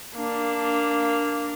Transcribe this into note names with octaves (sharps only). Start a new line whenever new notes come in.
A#3 D4